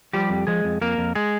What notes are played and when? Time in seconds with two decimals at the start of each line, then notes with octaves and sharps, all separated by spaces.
0.13 F3 G3 G4
0.30 F2
0.47 F3 G#3 G#4
0.64 F2
0.81 F2 A#3 A#4
0.98 F2
1.15 G#3 G#4